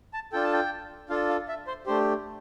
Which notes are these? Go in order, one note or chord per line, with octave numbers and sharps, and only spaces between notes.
A5
D4 F4 A4 G5
A5
G5
D4 F4 A4 F5
F5
E5
C5
A3 D4 G4 C5